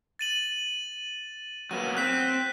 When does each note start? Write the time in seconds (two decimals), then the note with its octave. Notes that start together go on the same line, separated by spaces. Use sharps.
0.19 A6 D#7 F#7
1.71 F#3 A#3 B3 D#7
1.97 C4 F#6 B6